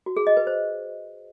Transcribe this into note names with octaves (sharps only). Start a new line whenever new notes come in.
F#4
G#4
D#5
B4
C5